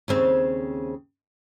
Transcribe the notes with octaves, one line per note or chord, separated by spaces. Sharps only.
D#2 C#3 C4